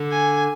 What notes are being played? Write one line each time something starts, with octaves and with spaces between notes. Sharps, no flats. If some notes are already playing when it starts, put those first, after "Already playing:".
Already playing: D3
G#5